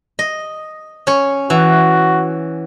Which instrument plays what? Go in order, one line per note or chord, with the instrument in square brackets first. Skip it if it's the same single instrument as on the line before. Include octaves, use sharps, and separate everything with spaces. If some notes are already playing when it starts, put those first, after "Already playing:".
[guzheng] D#5
C#4 C#5
[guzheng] E3 [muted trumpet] F#4